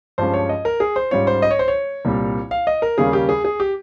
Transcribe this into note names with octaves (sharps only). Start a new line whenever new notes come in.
G2 F3 G#3 C#4 C5
C#5
D#5
A#4
G#4
C5
G#2 G3 C#4 F4 C#5
C5
D#5
C#5
C5
C#5
C2 A#2 G3
F5
D#5
A#4
D#2 C#3 G3 A#3 C#4 G#4
G4
G#4
G#4
G4